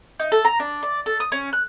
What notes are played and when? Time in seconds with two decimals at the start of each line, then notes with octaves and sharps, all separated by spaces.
0.20 D#4
0.32 A4
0.45 A#5
0.60 D4
0.83 D5
1.06 A4
1.20 D#6
1.32 C#4
1.53 F#6